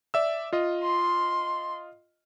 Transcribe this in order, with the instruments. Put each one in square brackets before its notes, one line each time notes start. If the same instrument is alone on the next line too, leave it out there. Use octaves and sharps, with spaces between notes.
[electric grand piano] D5 E5 E6
F4 D#5
[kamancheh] C6